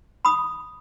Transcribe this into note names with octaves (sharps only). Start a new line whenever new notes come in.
B5 D#6